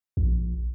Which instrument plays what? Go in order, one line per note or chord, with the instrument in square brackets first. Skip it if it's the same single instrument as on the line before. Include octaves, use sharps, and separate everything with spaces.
[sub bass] A#1